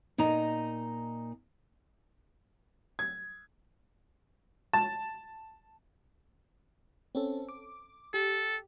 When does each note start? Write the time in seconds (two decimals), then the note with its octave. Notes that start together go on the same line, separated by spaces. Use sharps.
0.18 A#2 D#4 D#5 A#5
2.99 G#6
4.73 A5
7.15 C4 C#4 A4
7.49 D6
8.14 G4 A4